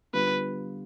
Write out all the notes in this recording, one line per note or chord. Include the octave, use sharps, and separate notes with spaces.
D3 G3 B3 F4 B4